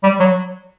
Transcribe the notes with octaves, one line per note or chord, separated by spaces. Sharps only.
G3
F#3